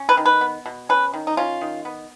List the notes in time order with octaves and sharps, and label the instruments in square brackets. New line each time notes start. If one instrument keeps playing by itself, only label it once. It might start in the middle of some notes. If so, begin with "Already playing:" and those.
Already playing: [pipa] C#4
B4
D#3
B4
B3
B2
C#4 B4
D#3
D#4
C#4 F4
D#3
B3